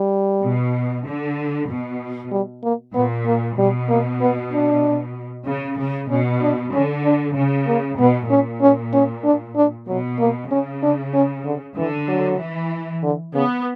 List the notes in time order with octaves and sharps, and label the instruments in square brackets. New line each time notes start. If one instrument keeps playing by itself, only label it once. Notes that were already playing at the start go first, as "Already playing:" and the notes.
Already playing: [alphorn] G3
[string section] B2
D3
B2
[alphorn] G3
A#3
[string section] A#2 [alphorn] B3
[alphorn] A#3
[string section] B2 [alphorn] G3
[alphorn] A#3
B3
D4
[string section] C#3
C#3
[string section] B2 [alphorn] C#4
[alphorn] D4
[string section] D3 [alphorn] C#4
[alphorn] D4
[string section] C#3 [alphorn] C#4
[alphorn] A#3
[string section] B2 [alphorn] B3
[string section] A#2 [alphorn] C#4
[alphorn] C#4
C#4
D4
D4
[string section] B2 [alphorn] F#3
[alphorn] A#3
[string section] C#3 [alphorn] C#4
[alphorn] D4
C#4
D3
[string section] D3 [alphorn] E3
[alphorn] F#3
[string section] E3
[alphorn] D3
[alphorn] C#3 [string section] B3